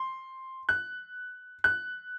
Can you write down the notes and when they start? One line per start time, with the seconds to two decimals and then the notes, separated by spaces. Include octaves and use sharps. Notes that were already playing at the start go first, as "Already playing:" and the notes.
Already playing: C6
0.69 F#6
1.64 F#6